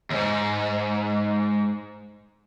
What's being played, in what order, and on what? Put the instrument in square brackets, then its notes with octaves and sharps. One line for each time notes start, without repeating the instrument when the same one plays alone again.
[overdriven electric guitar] D#2 G#2